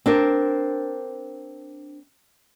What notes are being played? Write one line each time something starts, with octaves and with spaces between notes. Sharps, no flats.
C4 D4 A#4